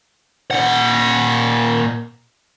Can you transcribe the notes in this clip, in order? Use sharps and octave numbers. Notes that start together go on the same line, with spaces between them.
A#2 F#5